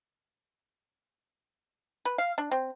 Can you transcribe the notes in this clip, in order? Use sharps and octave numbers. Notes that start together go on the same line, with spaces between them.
B4
F5
D4
C4